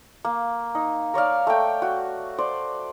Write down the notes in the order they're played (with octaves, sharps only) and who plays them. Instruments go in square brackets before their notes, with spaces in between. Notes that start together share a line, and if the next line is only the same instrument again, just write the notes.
[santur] A#3
D#4
A#4 C#5 D5 F5
A3 G5
F#4
C5 D5